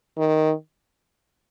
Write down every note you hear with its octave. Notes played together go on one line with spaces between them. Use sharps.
D#3